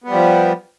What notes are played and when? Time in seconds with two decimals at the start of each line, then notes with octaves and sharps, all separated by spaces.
0.04 B3
0.08 G3
0.13 F3